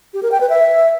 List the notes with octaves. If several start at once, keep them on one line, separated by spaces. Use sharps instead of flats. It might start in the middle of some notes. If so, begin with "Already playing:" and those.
G4
A#4
G5
B4
E5